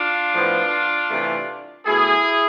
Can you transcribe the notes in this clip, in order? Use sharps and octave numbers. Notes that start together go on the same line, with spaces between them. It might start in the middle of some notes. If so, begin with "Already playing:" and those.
Already playing: D4 F4
A2 F3 B3
C3 E3 A3
B2 A3 E4 G#4